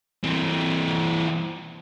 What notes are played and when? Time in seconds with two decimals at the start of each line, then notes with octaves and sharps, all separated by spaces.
0.23 E3 C4